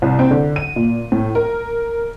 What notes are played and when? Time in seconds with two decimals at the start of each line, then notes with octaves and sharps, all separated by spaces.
0.02 C2
0.19 C4
0.31 D3
0.56 D#7
0.76 A#2
1.12 A2
1.35 A#4